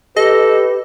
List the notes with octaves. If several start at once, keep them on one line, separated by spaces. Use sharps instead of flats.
G4 A4 B4 D#5